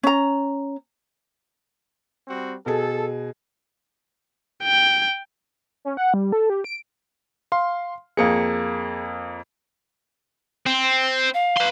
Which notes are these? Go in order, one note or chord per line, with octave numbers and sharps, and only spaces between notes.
C#4 A#5
G3 C4 F#4
B2 G#4 A4
G5
C#4
F#5
G3
A4
G4
D7
F5 C6
F2 A#3 G#4 C#7
C4
F5
B4 C6